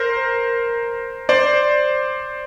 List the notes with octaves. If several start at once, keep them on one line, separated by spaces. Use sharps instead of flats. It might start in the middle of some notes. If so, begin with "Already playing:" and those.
Already playing: A#4 C5
C5 D5